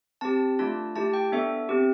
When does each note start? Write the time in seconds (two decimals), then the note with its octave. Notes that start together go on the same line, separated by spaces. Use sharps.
0.21 C4 G4 A5
0.59 A3 D4 F4 A5
0.96 A3 E4 G4 A5
1.13 G5
1.32 B3 D4 A4 E5
1.69 C4 G4